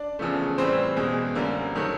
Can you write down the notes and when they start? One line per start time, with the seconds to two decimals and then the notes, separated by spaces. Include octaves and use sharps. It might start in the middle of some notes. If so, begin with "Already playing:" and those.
Already playing: D4 D5
0.19 E2 C#3 F3 A3
0.58 A2 E3 G3 C4 C5
0.97 E2 B2 G#3
1.35 F#2 D3 G3 A#3
1.75 D#3 F#3 A3